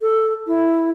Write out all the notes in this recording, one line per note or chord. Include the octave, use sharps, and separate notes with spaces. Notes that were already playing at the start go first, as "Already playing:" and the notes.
A4
E4